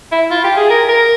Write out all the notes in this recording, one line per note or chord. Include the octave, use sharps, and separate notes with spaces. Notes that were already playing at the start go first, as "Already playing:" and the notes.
E4
F4
G4
G#4
A#4
A#4